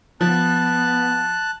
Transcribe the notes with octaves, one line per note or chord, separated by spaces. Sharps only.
F3 B3 A5 F#6